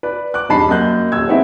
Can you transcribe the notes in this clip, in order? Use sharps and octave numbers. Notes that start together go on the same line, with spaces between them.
B4 D5
D6 F#6
E1 G2 D#4 A5 B5 C7
F#2 A#3 D#5 F#6 G6
D#1 E6 G#6
G#3 B3 C4 D#4 E4 E5